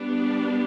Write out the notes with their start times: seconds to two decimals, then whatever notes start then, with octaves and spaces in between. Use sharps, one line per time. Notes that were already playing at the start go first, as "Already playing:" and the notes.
Already playing: G3 B3 D4
0.12 G4